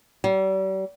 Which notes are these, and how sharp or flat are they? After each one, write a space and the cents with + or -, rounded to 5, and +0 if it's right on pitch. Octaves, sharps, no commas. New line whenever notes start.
G3 -40